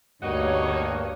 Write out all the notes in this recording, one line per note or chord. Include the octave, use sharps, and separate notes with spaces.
D2 G2 G3 A#3 D#4 F#4 C#5